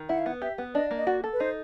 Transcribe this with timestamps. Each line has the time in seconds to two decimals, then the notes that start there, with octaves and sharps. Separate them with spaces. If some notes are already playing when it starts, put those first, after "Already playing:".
Already playing: D#3
0.09 E4 F#5
0.18 F5
0.26 B3 F#5
0.42 G4 E5
0.58 B3
0.75 D4 D#5
0.91 A#3
0.98 D#5
1.07 F#4 D5
1.24 A4
1.33 B4
1.40 D#4 C5